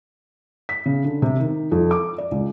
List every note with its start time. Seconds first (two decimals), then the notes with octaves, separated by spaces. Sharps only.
0.69 B6
0.86 C#3
1.04 D3
1.22 C3
1.40 D#3
1.72 F2
1.91 D6
2.18 D5
2.32 C#2